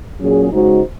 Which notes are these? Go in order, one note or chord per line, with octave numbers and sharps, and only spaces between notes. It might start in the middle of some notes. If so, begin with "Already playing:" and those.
A#2 F#3 C#4 G#4
C#3 G#3 D#4 F#4 C5